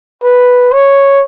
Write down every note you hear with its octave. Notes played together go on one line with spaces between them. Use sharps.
B4
C#5